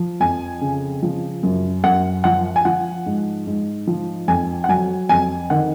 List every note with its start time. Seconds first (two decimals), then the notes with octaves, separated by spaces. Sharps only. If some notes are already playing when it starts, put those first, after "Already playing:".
Already playing: F3
0.20 F2 G#5
0.61 C#3
1.03 F3
1.43 F#2
1.84 F#2 F#5
2.24 F3 F#5
2.56 G#5
2.65 F3 F#5
3.06 G#2
3.47 G#2
3.87 F3
4.28 F2 G#5
4.64 F#5
4.69 F#3 G#5
5.09 F2 G#5
5.50 D#3 F#5